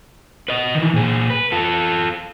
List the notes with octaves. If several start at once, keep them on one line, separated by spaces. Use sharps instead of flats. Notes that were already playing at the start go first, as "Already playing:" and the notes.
B4 D#5
D#3 E3
A#2 G#4
B4
F4 A4